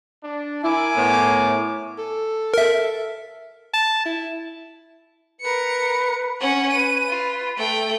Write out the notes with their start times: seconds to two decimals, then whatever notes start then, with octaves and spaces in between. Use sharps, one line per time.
0.22 D4
0.63 E4 A#4 G#5 D6
0.96 A2 B3
1.98 A4
2.54 A#4 E5
3.74 A5
4.05 E4
5.41 A#4 B4 C#7
6.41 C#4 F#5
6.71 B4 D#7
7.09 F4
7.57 A3 G5